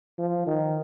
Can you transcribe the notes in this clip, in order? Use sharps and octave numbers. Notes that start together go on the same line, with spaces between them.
F3
D#3